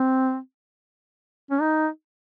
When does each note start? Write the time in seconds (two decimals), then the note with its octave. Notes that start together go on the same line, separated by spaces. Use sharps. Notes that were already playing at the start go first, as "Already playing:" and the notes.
Already playing: C4
1.51 C#4
1.61 D#4